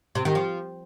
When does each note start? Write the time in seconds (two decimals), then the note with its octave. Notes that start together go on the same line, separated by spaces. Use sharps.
0.15 C3
0.25 D#3
0.35 F3